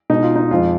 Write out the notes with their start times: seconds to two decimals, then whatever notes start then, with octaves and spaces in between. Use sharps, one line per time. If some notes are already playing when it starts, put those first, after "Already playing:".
0.10 B2 G#3 D#4
0.23 F4
0.36 D#4
0.51 F2 F3 G#3 F4